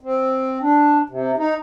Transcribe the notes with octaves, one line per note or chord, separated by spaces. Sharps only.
C4
D4
C3
D#4